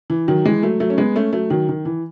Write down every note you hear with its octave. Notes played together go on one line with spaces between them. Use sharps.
E3
D#3 F#3
E3 G#3
F#3 A3
F#3 A3
C#4
G#3 B3
A3 C#4
F#3 A3
D#3 F#3
D#3
E3